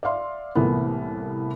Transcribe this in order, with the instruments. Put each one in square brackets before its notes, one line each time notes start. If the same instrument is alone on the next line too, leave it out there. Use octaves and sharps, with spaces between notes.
[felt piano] D5 E5 F5 C6
C2 A2 E3 A#3 B3